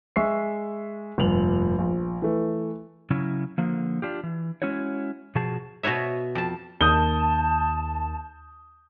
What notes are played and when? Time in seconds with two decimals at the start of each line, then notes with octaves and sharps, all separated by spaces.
0.16 G#3 E5 C#6 E6 C7
1.18 F1 G2 A#2 F7 F#7
1.78 A#1
2.22 E3 A3
3.10 C#3 F#3 C#4 E4
3.58 D3 F3 A#3
4.02 D4 F4 G4
4.23 E3
4.62 G#3 C#4 E4 F#4 C#5
5.35 B2 F3 F#4 G#4 A5
5.83 B2 F#4 B4 C#5 E5
6.35 F2 A5
6.81 D#2 A5 D#6 G6 G7